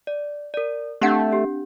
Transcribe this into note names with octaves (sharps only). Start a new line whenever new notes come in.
D5
A#4 D5
A3 C4 D4 G4 F#5 G6
G4